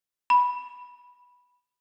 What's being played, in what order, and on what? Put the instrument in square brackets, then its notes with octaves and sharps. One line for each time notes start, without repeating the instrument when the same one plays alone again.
[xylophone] B5